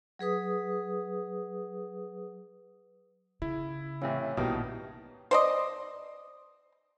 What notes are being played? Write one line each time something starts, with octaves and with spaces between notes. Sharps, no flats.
F#3 G#4 B4 D#6
C#3 E4
A2 C3 E3 C#4 C#5 F5
A#1 B2 D#3 G3 A#3 E4 B4 A5
C5 D5 D#5